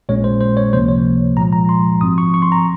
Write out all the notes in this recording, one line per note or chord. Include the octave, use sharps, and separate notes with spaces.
A#1 A#2 G#3 C#4 C#5
C5
C5
C#5
C#2 C3 F3 A#3 C5
C#5
A#2 F3 G#3 A#5
A#5
C6
G#1 G#2 F3 C4 D#6
C#6
C#6
C6
A#5